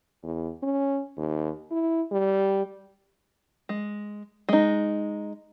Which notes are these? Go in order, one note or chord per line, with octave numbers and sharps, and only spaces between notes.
E2
C#4
D#2
E4
G3
G#3
G#3 D#4